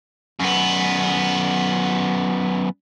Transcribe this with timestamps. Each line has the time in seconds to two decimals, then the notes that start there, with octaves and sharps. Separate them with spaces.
0.40 F#2 B3